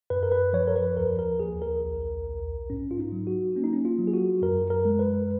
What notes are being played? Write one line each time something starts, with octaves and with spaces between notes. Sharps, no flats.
F#2 B4
A#4
B4
F3 C#5
A#4
B4
D#2 A#4
A#4
D#2 G#4
A#4
B1
B1
G#2 C#4
F4
D#4
F#3
F#4
A#3 C#4
D#4
C#4
F4
F#3
G#4
F#4
F#2 A#4
A#4
G#3
B4